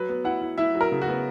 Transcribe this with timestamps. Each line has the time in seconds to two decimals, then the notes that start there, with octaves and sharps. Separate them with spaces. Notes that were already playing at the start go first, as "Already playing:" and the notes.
Already playing: F#3 B4
0.09 B3
0.24 E4 F#5
0.41 E4
0.58 E4 E5
0.75 F#3
0.81 A#4
0.92 C#3
1.01 F#4
1.08 B3